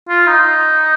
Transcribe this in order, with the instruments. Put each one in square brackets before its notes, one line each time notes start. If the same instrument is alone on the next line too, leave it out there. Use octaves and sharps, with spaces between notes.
[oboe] F4
D#4